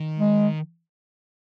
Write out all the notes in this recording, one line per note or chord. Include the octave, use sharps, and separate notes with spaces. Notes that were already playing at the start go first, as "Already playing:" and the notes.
Already playing: D#3
G#3